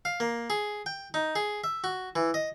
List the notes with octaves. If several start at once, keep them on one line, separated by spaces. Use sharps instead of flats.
F5
A#3
G#4
G5
D#4
G#4
E5
F#4
E3
D#5